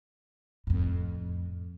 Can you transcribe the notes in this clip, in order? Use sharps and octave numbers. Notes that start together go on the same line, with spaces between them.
F2 A2